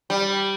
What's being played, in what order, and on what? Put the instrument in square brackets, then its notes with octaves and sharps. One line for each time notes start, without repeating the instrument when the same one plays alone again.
[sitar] G3